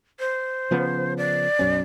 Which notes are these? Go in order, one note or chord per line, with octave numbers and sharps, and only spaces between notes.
C5
C#3 F3 B3
D5
B1 F#2 C#4